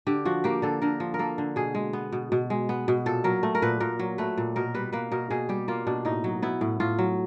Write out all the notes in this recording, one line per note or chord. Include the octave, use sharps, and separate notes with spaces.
D3 G4
F3 F#4
A#3 G4
D3 A4
D3 A#4
F3
A#4
A#3 A4
D3
B2 G#4
G#3
B3
B2
B2
G#3
B3
B2
A#2 A4
F#3 A#4
A3
A#4
A#2 B4
A#2 A#4
F#3
A3 B4
A#2
B2 A#4
G3 B4
A#3 B4
B2 A#4
B2 G#4
G3 G4
A#3 F4
B2 D4
A2 D#4
F#3
B3 E4
A2
A2 F4
F#3